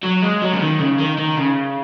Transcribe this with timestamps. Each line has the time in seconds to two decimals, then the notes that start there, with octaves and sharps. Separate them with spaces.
0.03 F#3
0.22 G#3
0.42 F#3
0.53 C#3
0.61 D#3
0.80 C#3
0.99 D#3
1.18 D#3
1.37 C#3